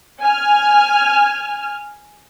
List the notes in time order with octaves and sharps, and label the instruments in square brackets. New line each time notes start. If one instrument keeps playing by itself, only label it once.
[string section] G#5 F6